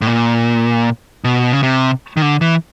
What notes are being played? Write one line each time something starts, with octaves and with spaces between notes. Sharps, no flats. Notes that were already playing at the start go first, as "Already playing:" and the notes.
A2
A#2
B2
C#3
C3
D#3
D3
E3